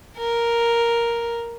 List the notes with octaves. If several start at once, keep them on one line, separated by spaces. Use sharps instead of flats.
A#4